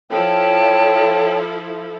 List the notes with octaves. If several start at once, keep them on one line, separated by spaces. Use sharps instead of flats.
F3 E4 A4 C#5 G5 A5